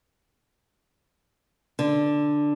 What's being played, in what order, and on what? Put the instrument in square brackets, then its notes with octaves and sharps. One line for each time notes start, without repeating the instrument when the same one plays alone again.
[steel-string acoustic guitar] D3